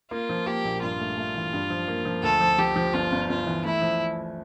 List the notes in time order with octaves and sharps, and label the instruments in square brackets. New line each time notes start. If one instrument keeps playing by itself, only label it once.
[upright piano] A#3 [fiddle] F4
[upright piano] F3
[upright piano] A#3 [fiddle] G4
[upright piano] A#1
[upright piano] G2 [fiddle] F4
[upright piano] A3
A3
E3
G2
F3
A#3
F3
[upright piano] D2 [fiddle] A4
[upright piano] F3
[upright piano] F3 [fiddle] G4
[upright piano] F3
[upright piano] G1 [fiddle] F4
[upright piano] G1
[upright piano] G1 [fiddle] F4
[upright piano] E3
[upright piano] A3 [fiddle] E4
[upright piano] F3